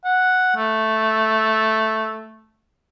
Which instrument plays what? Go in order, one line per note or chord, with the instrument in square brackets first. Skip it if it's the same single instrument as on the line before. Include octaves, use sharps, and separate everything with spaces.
[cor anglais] F#5
A3